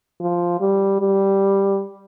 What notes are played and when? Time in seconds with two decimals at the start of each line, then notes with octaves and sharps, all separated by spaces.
0.20 F3
0.60 G3
1.00 G3